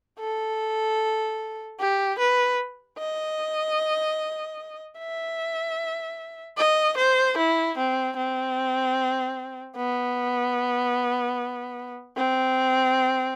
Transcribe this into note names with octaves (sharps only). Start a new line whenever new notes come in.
A4
G4
B4
D#5
E5
D#5
C5
E4
C4
C4
B3
C4